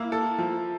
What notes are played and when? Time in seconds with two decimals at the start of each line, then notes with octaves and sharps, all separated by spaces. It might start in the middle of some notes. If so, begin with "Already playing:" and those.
Already playing: A#3 E4
0.12 A4
0.38 F3